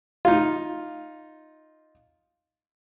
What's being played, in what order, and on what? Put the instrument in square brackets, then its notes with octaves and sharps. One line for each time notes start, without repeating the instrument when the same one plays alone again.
[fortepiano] D#4 F4